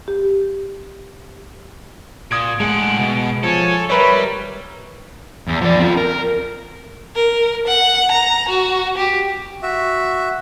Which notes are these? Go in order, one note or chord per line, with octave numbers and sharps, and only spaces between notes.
G4
A#2 D#6 G#6 D7
A2 G#3 F#5 D7
B2
F3 A4 C#5 G#5
G3 A#4 B4 C#5 E5
E2
F3 D5
C4 F4
A#4
A#4
F#5
A#5
F#4
G4
F#4 E5